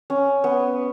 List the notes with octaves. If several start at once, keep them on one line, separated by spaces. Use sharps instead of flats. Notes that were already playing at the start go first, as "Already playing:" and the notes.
C#4
B3